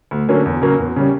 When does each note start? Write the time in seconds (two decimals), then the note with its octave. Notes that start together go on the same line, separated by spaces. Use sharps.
0.11 D2
0.29 D3 F#3 A#3 C#4
0.45 E2
0.62 C#3 F#3 A#3
0.79 E2
0.96 C#3 G3 C#4